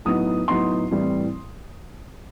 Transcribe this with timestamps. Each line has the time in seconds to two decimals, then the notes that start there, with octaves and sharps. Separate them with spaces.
0.05 A2 F#3 B3 D#4 D#6
0.48 A2 F#3 B3 D#4 C6
0.91 A2 E3 G3 C4